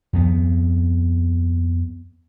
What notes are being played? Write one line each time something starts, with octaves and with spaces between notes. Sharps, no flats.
F2 B3